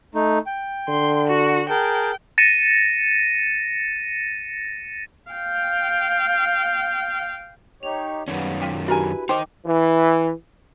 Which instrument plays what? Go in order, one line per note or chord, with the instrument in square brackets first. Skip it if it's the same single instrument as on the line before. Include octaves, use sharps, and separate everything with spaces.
[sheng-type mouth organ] A3 D#4
G5
[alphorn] D3 [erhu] C6
[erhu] F#4
[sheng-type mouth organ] G#4 A#4 A5 [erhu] G5
[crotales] A6 A#6 C#7 D#7 E7
[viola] F5 G5
[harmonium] D#4 G4 C#5 [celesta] F7
[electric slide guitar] F#2 D#3 C#4 [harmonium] G3 A#3 B3
[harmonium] D3 [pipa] F4 G4
[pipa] D4 A#4 G#5 [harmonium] E4 B4 [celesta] F#4 G4
[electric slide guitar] D#4 A#4 D#5 [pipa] C5 [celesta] G5 D6
[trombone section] E3